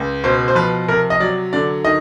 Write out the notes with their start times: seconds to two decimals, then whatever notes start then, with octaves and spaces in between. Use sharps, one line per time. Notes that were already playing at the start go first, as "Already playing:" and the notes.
Already playing: C#2
0.24 B2 C5
0.48 C5
0.55 F3 B4
0.88 C3 A#4
1.10 D#5
1.20 F#3 D5
1.53 D3 D5
1.85 D#3 D#5